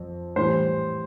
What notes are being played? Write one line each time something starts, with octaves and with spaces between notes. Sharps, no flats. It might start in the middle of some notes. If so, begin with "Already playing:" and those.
Already playing: F2
A2 E3 G3 C5